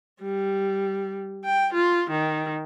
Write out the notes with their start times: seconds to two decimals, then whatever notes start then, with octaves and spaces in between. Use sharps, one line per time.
0.22 G3
1.44 G5
1.73 F4
2.10 D#3